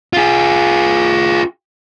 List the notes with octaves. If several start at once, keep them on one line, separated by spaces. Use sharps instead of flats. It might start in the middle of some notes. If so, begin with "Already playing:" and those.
F4 G#4